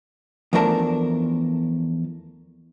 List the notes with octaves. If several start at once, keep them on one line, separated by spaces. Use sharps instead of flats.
E2 F3 A3 D4 A#4 A5